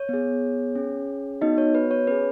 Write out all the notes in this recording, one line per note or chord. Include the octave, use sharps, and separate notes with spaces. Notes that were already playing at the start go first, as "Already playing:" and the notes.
Already playing: C#5
B3 G#4
C#4 G#4
B3 D#4 F#4 D#5
C#5
B4
C#5
C#4 G#4 B4